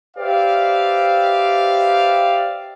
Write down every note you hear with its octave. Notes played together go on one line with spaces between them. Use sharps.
G4 B4 C5 D5 E5 F5